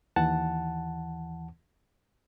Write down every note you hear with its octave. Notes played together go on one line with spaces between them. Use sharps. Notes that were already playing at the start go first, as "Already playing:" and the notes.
D#2 E3 F#5 A5